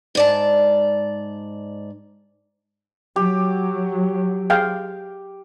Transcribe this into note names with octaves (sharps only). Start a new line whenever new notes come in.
G#2 D5 A5
F#3 G4
G#4 F5 G5